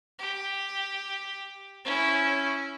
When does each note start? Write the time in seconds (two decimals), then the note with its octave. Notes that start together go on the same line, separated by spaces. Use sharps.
0.19 G4
1.85 C#4 E4